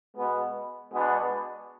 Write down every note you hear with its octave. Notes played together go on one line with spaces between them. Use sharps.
B2 G#3 B3
B2 G#3 B3 D4